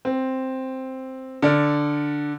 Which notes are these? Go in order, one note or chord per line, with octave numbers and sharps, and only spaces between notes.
C4
D3 D5 F6